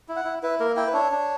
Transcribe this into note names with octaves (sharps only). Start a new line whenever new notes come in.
E4
F#5
E4
E4 B4
A#3 A#4
E4 G5
B4
D4 C#5
D4